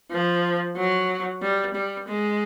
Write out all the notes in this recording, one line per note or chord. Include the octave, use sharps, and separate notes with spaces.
F3
F#3
G3
G3
G#3